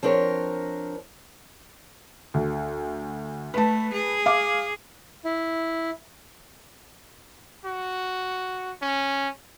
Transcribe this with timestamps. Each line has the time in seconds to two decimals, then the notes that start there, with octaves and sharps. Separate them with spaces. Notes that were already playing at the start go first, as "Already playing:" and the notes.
0.03 F3 C4 D4 A#4 C#5
2.34 D2
3.54 A3 B4 A5
3.93 G#4
4.26 F5 D6
5.25 E4
7.65 F#4
8.82 C#4